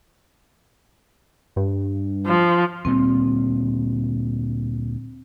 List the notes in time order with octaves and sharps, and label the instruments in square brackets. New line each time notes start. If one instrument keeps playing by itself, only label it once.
[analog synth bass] G2
[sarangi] F3
[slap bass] D2 A#2 G3 [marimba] C4